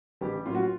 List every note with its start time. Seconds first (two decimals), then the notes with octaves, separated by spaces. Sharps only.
0.21 A1 G3 G4
0.46 A2 F#3 A#3 C#4 F4
0.55 F#4
0.62 F4